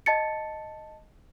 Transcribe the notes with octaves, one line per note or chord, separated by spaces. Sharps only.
D#5 A5 A6 C#7